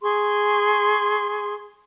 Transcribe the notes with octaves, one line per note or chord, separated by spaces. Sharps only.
G#4 C6 C#6